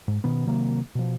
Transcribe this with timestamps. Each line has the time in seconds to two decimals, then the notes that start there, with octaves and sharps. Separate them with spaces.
0.08 G#2
0.24 B2 D#3 B3
0.47 C3 D#3 F#3 A#3
0.95 B2 F3